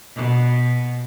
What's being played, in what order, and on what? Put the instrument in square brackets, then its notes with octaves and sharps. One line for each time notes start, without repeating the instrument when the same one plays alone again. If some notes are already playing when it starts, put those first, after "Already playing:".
[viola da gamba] B2